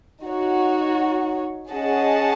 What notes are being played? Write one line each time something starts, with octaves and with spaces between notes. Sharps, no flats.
D#4 F#4 C#5
C#4 G#4 D#5 F#5 A5